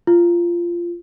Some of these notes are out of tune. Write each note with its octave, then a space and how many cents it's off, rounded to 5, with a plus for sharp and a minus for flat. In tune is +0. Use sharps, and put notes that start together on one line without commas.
F4 -15